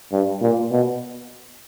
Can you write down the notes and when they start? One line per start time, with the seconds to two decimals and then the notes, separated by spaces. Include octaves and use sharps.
0.12 G2
0.41 A#2
0.71 B2